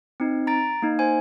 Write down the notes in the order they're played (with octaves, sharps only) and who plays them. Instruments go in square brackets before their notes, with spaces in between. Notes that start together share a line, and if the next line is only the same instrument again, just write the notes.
[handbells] C4 D#4
A#5 A6 D7
A#3 D#4
C5 G#5